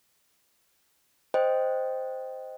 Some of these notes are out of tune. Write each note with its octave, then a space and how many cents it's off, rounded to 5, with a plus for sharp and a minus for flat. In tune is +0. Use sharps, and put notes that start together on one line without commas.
C5 -5 D#5 -5 G5 +0